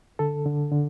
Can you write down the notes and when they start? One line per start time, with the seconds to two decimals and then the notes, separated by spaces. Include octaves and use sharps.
0.19 D3 A4
0.46 D3
0.72 D3